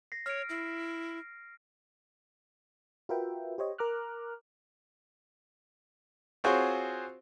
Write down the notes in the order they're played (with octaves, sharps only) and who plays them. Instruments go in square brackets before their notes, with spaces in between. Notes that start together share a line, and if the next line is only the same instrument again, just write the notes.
[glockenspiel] A#6 C7
[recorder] C#5 [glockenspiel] F6 D7
[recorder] E4 [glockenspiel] A#6 C7
[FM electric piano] F4 F#4 A#4 B4 E5 G5
G4 C5 C#5 D#5
A#4 A#5 D6 F6 F#6
[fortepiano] C4 F4 F#4 G#4 C5 C#5